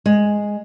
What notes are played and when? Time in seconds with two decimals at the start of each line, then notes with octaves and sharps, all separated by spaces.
0.06 G#3